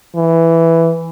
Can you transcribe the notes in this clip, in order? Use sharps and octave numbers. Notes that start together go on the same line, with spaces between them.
E3